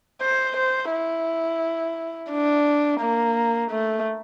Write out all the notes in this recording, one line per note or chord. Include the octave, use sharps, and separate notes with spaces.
C5
C5
E4
D4
A#3
A3